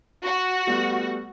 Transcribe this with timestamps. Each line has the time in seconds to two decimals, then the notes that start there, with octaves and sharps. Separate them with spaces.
0.24 F#4
0.67 G3 A3 B3